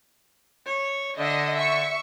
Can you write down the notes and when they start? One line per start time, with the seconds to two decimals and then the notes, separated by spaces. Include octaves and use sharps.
0.66 C#5
1.17 D3 D#5 E5
1.54 E5 C#6